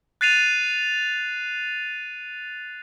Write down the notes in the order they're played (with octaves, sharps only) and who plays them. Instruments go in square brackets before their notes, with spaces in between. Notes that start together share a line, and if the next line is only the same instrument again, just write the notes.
[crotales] F#6 A6 C7 D#7 F7